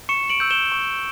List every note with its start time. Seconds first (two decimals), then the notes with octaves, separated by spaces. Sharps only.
0.09 C#6 C#7 E7
0.30 D7 F#7
0.40 E6 G6
0.50 E7 G7
0.72 C#6